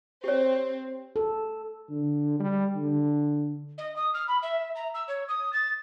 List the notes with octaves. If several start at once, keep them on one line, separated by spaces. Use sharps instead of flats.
C4 G4 C#5
A4
D3
G3
D3
D#5
D#6
F6
B5
E5
A#5
E6
C#5
D#6
A6